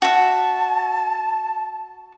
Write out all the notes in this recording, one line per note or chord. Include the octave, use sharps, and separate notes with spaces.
F#4 E5 A5